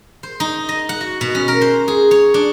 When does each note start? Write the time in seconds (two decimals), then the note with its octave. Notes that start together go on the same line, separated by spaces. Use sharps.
0.23 C5
0.40 D#4
0.69 D#5
0.89 F#5
1.01 F#4
1.21 B2
1.35 C#4
1.48 A#4
1.61 C5
1.88 G#4
2.11 C#5
2.34 D4